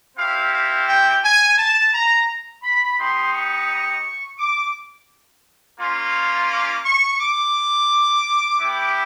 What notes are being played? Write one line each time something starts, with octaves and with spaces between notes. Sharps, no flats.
C4 E4 G4 F5
F5
G5
G#5
A5
A#5
B5
B3 D#4 G4 C6
C#6
D6
A#3 C#4 F4
D6
C#6
D6
B3 E4 G4